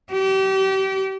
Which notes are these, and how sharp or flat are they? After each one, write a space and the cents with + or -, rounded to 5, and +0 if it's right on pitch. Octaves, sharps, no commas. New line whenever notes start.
G4 -30